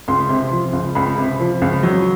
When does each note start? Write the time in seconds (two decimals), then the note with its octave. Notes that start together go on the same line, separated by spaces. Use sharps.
0.08 C#2 C6
0.29 C3
0.51 F3
0.73 C#2
0.95 C#2 B5
1.18 C3
1.40 F3
1.62 C#2
1.83 F#3